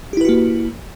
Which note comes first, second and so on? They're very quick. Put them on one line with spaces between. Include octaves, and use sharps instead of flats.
G4 E4 B4 F#4 A#3